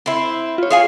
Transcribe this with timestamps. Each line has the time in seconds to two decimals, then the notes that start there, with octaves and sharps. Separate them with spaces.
0.06 C4 E4
0.58 F4 C#5
0.71 G#4 F5 G#5